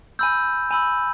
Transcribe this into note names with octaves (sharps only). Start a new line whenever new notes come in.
G#5 B5 E6 G6
G#5 B5 E6